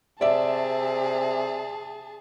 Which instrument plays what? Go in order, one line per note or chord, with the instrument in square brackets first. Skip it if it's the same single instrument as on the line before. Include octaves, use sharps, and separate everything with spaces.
[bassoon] C3 [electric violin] G#4 A5 [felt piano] D5 E5